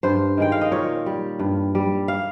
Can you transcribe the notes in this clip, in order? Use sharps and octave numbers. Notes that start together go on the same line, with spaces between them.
G2 C5
D#3 G#3 G5
F5
D#5
A#2 C#5
G3
G2
G3
F5